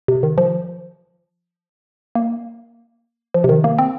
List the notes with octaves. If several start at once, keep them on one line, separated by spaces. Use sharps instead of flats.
C3
D#3
F3
A#3
F3
C3
D#3
A#3
C4